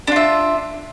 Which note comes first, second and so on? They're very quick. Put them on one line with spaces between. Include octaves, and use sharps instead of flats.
D4 F4 E5